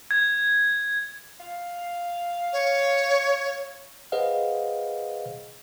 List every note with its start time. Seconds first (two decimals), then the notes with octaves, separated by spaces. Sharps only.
0.11 G#6
1.40 F5
2.53 C#5
4.12 G#4 B4 C5 D#5 F5 F#5